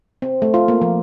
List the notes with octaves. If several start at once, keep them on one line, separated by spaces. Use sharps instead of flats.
C4
A3
F4
A#3
F3